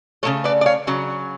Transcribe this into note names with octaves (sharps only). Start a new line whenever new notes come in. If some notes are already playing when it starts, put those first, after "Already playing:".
C#3 F#3 A3 A4 C#5
B4 D5
D5
C#5 F5
C#3 F#3